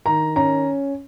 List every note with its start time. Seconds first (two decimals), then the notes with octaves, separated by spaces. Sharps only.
0.06 D#3 A#5
0.36 C#4 A#5